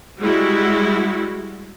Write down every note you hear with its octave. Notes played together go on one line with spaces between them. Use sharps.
G3 G#3 E4 F#4